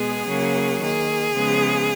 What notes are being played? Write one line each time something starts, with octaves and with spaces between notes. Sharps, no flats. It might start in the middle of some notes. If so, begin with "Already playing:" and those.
Already playing: B2 G#3 B3 G#4
C#3 F#3 A#3
D#3 A#3 G#4
C#3 F3 G#3 B3